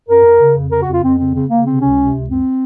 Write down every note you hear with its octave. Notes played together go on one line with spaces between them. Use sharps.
F#2 A#4
F#2
C#3
F2
C#3 A#4
F#4
F2 F4
F2 C4
C#3 C4
C#3 C4
C#3 A#3
C3 C4
C#2 C#4
C3
C#2
F#2 C4